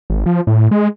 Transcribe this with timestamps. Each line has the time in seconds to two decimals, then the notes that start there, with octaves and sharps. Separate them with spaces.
0.10 G#1
0.26 F3
0.47 A2
0.71 G#3